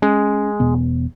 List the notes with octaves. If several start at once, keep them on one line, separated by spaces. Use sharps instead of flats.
G#3 C#4
E1 B2 B3